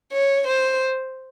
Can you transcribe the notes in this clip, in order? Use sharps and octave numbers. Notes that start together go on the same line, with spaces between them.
C#5
C5